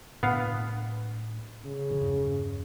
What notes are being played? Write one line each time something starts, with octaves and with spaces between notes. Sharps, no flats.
A2 B3 D4 F5
C#3
E2 G2